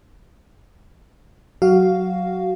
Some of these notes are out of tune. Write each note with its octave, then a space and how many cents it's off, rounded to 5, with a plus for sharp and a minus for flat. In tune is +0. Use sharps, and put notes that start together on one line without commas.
F#3 +0 F#4 +15 F5 +0